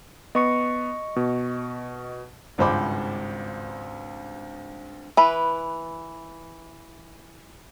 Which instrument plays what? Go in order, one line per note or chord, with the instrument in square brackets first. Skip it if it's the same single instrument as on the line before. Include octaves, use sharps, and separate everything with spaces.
[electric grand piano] B3 [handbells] D#5 C#6 C#7
[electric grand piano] B2
[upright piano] G#1 C#2 G2 C5 B5 D6
[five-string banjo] E3 B4